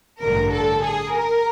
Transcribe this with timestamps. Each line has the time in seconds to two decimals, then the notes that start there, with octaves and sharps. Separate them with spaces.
0.21 A1 G2 D3 A#4
0.52 A4
0.83 G#4
1.13 A#4